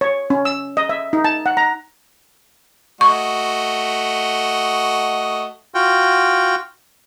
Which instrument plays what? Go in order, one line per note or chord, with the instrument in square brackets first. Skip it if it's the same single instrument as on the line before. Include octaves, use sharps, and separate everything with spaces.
[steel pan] C#5
C#4
E6
D#5
E5
D#4
A5
F#5
A#5
[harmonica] A3 F#4 D#5 [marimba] C#6
[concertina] F4 F#4 G5